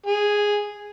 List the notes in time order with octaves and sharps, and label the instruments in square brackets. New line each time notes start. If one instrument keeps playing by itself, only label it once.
[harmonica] G#4